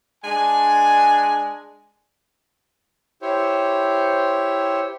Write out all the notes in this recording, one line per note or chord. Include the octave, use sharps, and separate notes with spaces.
G#3 D4 G#5
E4 G4 C5 C#5